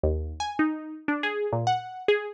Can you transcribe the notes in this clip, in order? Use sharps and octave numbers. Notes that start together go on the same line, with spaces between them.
D#2
G#5
D#4
D4
G#4
A#2
F#5
G#4